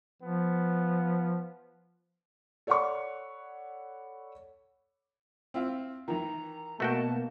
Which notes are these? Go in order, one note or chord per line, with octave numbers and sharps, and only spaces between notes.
F3 B3
A4 C#5 D5 F#5 B5 C#6
C4 E4 F4
D#3 E3 A#5
B2 A3 A#3 F#4 G5 A5